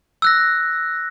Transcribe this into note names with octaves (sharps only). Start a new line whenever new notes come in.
E6 F#6 A#6